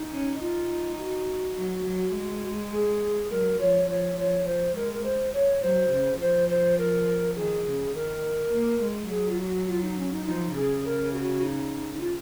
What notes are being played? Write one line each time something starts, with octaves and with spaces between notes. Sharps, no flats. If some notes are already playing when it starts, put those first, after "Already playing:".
Already playing: D#4
C#4
D#4 F4
F#4
F#3
F#3
G#3
G#4
F#3 A#4
F3 C#5
F3 C#5
F3 C#5
F3 C5
G#3 A#4
A#4
C5
C#5
F#3 C5
C#3
F3 C5
C5
A#4
D#3 G#4
C#3
D#3 A#4
A#3
G#3
F#3 G#4
F4
F#4
F4
D#4
C#4
D#4
F3 D#4
C#3 G#4
A#4
F#4
D#4
D#4
F4